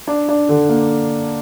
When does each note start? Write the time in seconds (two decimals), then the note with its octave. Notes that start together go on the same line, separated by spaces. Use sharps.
0.07 D4
0.29 D4
0.49 D3
0.69 A#3